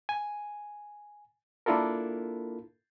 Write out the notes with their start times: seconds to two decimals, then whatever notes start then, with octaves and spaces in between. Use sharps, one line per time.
0.09 G#5
1.66 A#3 D4 E4 F4 A4 A#4